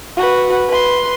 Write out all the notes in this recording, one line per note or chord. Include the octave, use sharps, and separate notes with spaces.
F#4 B4
B4 C6